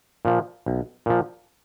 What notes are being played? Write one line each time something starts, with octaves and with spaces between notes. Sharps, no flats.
A#2 F3
B1
A#2 F3